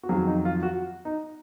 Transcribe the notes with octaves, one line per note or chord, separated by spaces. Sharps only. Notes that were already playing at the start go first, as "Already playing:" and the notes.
F#4
F2 D#3 F#3 G#4
D#4
F4
F#4
D#4